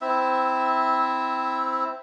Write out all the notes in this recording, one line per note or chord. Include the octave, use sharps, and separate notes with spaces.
C4 E4 E5